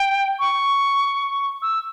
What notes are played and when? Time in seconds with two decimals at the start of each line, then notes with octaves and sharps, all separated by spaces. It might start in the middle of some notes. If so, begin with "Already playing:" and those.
Already playing: G5
0.39 C#6
1.62 E6